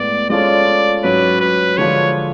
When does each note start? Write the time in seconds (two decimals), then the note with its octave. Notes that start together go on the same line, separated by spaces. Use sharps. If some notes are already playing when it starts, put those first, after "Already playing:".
Already playing: A2 G#3 B3 D5
0.30 G#3 C#4 F4 A4 C#5 D5
1.04 G#2 F#3 C#4 B4
1.41 B4
1.77 D3 F3 G#3 D4 F4 C#5